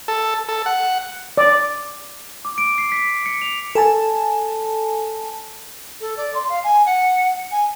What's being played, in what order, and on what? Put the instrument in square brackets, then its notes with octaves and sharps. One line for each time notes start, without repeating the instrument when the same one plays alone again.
[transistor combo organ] A4
A4
F#5
[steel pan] D5
[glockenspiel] D6
D7
C7
B6
C#7
F7
[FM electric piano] A4 G#5 A5
[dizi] A4
D5
C6
F5
G#5
F#5
G#5